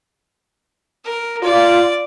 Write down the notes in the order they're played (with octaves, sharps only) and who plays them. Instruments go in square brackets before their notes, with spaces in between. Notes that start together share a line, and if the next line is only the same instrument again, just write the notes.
[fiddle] A#4
[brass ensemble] F4 [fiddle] D5